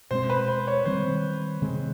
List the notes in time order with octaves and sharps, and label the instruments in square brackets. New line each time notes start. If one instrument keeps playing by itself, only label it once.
[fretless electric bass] B2 G#3 C4 [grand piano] C5
[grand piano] B4
C5
C#5
[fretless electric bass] D#3 G3 C4 [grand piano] C5
[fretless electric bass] C3 D#3 G#3 C4